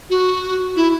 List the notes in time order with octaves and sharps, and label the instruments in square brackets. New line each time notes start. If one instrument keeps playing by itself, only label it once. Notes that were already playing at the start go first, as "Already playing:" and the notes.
[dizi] F#4
E4